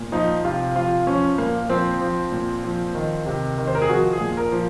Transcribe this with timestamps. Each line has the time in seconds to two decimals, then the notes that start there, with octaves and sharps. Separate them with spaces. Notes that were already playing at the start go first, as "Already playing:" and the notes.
Already playing: A#2
0.12 F3 D#4
0.44 C3 F4
0.75 F3 F4
1.07 F3 C#4
1.38 A#2 A#3
1.69 F3 C4
2.01 F3
2.32 A#2
2.64 F3
2.95 D#3
3.26 C3
3.58 D#3
3.67 C5
3.75 A#4
3.82 G#4
3.89 F3 F#4
4.13 G#4
4.21 A#2
4.37 A#4
4.52 F3